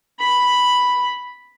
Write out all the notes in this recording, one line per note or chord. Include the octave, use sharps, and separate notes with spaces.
B5